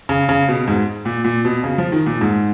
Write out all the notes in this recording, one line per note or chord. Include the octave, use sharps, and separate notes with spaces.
C#3
C#3
B2
G#2
A#2
A#2
B2
C#3
F3
D#3
A#2
G#2